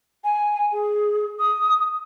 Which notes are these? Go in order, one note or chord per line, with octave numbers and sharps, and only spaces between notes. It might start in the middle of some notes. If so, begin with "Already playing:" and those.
G#5
G#4
D#6